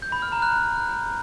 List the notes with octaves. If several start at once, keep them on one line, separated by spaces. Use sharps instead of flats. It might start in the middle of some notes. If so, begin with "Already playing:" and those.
G6
B5
F6
A#5
F#6